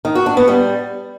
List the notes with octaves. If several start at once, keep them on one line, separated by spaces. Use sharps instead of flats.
D#3
F#4
D4
B3
G3